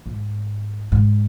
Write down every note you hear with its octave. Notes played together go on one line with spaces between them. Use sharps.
G#2
G#2